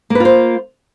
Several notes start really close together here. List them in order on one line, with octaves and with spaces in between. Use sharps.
A#3 B4 F4 C5